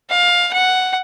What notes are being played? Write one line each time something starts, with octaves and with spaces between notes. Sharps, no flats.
F5
F#5